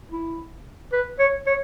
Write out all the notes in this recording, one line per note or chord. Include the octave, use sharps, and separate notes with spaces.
E4
B4
C#5
C#5